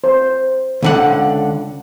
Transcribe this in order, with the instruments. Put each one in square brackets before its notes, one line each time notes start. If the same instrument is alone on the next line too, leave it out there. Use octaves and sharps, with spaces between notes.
[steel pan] C5
[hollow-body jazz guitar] C#2 D3 F#5